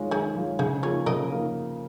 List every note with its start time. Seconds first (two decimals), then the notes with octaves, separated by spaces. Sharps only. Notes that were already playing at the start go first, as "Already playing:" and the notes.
Already playing: D#3 G#3 F4 C#5
0.11 D#3 D#4 G#4
0.36 G#3 F4 C#5
0.59 C#3 D#4 G#4
0.83 F3 A#3 D#4 G#4 C#5
1.06 C#3 A#4 D#5
1.31 F3 A#3 D#4